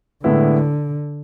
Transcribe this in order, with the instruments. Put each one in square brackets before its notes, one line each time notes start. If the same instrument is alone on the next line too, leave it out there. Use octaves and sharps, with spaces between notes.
[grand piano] A2 G#3 B3 E4 [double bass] D3